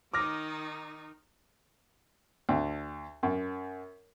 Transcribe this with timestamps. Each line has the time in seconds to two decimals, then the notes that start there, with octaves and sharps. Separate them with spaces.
0.14 D#3 D#4 D6 F6 A#6
2.49 D2
3.23 F#2